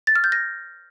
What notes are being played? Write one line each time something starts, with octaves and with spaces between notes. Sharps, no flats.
A6
F6
G6
A#6